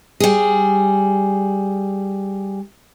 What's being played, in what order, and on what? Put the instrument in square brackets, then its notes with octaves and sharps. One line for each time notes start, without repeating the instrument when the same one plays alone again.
[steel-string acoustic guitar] G3 G#4